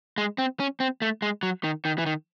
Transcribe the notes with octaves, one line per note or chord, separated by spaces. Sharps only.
G#3
C4
C#4
C4
A3
G#3
F#3
D#3
D#3
E3
D#3